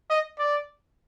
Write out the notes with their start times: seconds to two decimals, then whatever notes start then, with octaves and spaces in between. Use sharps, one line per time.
0.10 D#5
0.38 D5